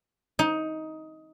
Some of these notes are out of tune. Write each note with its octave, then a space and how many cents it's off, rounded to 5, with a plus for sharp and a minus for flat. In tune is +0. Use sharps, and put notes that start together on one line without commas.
D#4 +15